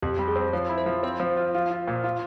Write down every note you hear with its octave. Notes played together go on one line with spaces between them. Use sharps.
F2 G4
G3
G#4
C4
F3 C#5
E4
C5
F3
C4 C5
F3
F4
F4
F4
A#2
F4